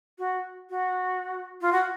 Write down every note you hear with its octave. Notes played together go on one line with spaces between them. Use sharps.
F#4
F#4
F4
F#4